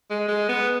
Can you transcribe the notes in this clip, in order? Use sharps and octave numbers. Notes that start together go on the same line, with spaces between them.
G#3
G#3
B3